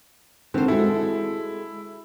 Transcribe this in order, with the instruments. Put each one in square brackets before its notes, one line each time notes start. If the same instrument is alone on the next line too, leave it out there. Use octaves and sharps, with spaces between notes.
[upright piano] D3 D#3 [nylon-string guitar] C4 C5
[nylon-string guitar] G#3 F#4 A4 [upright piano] E4